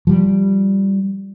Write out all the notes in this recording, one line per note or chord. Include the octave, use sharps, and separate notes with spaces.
F3 G3